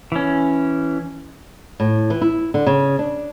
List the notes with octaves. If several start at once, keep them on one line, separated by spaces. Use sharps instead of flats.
E3 C#4
A2
E3
E4
D3
C#3
D4